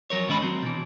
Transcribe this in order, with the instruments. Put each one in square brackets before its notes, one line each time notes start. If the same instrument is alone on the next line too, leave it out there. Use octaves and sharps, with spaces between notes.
[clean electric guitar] F2 F#3 A#4 C#5
G#2 D#3 G#3 C#4 D#5 B5
F#3 C4
B2 E3